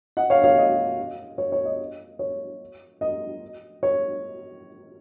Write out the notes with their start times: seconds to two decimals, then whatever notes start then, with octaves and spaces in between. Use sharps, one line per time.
0.17 D#5 F#5
0.30 C#5 F5
0.44 C#5 F5
0.58 D#5
1.38 C#5
1.52 C#5
1.65 D#5
2.19 C#5
3.01 D#5
3.83 C#5